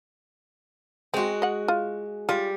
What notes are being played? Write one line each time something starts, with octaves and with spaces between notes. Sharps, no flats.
G#3 C4 F#4
D#5 F#5
F4
G3 F4